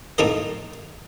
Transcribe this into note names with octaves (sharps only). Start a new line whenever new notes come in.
A#1 A2 D#4 A#4 D#5